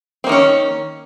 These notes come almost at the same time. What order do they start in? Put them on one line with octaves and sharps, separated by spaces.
C4 A#3 D#3 C#4